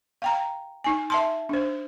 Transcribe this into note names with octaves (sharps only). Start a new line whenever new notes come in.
F5 G5 A#5
D#4 G#5
E5 A5 C6
D4 C5